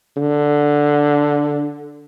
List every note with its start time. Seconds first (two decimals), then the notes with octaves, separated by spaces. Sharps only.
0.17 D3